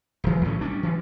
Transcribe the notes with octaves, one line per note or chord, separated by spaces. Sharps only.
D#1 E3
B1 A2 C#3 C#4
G3 C#4 D4
E3 F3 G3